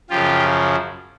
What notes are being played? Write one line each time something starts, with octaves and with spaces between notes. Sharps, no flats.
F#2 C#3 F3 F4 G4